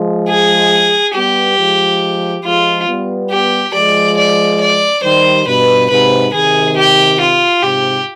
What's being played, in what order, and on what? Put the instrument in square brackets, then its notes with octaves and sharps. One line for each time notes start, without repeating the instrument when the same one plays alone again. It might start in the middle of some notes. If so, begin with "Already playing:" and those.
Already playing: [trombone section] F3 G#3
[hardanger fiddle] G#4
[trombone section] G3 B3 [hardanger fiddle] G4
[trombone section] F3 G#3
[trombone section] F3 G#3 [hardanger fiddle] F4
[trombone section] G3 B3
[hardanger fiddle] G4
[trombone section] F3 G#3 [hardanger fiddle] D5
[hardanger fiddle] D5
D5
[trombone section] D#3 G3 [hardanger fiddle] C5
[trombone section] G2 B2 [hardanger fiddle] B4
[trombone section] G#2 C3 [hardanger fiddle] B4
[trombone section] C3 D#3 [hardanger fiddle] G#4
[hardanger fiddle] G4
F4
[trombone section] G#2 C3 [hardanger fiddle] G4